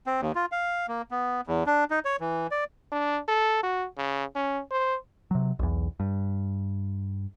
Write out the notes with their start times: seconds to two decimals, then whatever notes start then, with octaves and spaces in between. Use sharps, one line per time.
0.06 C4
0.21 D#2
0.35 F4
0.52 F5
0.88 A#3
1.11 B3
1.47 E2
1.67 D4
1.90 D#4
2.05 C#5
2.20 E3
2.51 D5
2.92 D4
3.28 A4
3.63 F#4
3.98 C#3
4.36 C#4
4.71 C5
5.31 C3 F#3
5.59 B1 E2
6.00 G2